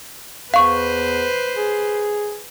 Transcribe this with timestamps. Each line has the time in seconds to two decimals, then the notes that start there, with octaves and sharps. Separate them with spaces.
0.54 E2 B4 C5 F5 C#6
1.56 G#4